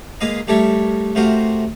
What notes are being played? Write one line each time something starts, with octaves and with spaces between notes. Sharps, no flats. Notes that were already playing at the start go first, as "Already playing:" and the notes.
G#3 A#3 B4 D#5 F5
G3 A3 A4 A#4 C#5 E5
C3 A3 F4 F#4 A#4 C5